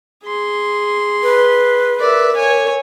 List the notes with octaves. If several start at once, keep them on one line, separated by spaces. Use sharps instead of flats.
G#4 C6
B4
A#4 D5 E5
C#5 G#5